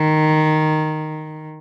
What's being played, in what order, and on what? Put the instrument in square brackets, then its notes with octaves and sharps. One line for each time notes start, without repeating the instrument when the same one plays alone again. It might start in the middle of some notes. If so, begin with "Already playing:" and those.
Already playing: [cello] D#3